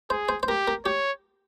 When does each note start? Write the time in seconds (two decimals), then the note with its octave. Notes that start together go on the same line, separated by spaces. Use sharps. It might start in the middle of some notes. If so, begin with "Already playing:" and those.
0.10 G#4 C5
0.29 C5
0.43 C5
0.48 G4 A#4
0.68 A#4
0.85 G4 C#5